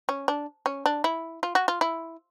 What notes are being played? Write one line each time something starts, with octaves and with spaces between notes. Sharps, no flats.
C#4
D4
C#4
D4
E4
F4
F#4
F4
E4